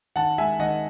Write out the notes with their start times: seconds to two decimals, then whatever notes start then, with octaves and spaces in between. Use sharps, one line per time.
0.15 D#3 F#5 A5
0.38 G#3 E5 G#5
0.59 D#3 D#5 F#5